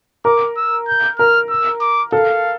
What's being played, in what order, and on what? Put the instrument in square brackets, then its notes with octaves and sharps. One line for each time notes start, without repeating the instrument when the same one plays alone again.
[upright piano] A#4 [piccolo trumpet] D6
[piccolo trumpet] E6
G6
[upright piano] A#4 [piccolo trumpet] F6
[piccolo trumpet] E6
D6
[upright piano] A4 [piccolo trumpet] F5